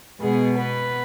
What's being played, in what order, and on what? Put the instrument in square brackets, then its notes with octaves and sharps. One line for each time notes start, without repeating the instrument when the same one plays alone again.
[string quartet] B2 G#3 B3 G#4
B3 B4